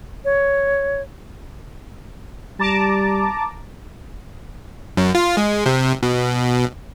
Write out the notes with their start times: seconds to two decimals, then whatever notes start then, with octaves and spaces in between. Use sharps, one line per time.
0.25 C#5
2.59 G3 A5 A#5 D6
4.97 F#2
5.15 F4
5.37 G#3
5.66 C3
6.03 B2